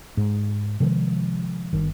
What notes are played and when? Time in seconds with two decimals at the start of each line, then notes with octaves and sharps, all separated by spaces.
0.17 G#2
0.80 C3 D#3 F3 G#3
1.73 G1 D#3